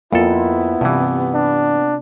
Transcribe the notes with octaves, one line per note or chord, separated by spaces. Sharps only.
F2 A#3 B3 E4 F4 A4
G2 C3 E3
D4